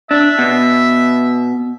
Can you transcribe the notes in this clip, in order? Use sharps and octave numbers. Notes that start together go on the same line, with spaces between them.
D4 E5
B2